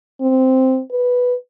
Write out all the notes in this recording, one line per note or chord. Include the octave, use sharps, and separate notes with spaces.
C4
B4